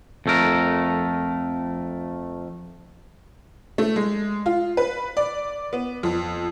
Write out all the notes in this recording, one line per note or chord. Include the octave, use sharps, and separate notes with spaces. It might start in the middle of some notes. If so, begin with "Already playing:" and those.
F2 A3 A#4
A3
G#3
F4
B4
D5
B3
F2